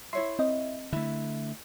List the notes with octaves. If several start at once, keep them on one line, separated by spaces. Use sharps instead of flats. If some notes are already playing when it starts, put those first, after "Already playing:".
E4 C#5 E5 C6 C7
C4 D#5
D3 A3 E4